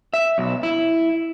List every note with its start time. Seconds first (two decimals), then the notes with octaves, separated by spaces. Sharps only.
0.14 E5
0.38 B1
0.63 E4